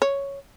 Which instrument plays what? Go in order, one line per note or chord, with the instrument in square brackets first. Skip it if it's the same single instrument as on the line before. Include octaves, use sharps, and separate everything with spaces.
[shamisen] C#5